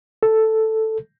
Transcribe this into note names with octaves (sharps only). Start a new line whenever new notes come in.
A4